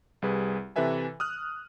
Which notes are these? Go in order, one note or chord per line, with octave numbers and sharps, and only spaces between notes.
C2 G3 G#4 B4
C3 E3 A4 B4 E5 G#5
D#6 F6 F#6